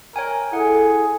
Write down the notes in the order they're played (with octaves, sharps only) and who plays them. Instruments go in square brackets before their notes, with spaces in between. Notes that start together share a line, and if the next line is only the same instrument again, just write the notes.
[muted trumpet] A#4 [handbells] C#5 G5 G#5
[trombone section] E4 A4 [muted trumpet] G#4 [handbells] F#5